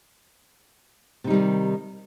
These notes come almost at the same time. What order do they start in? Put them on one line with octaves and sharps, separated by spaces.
C3 D#4 G3 D#3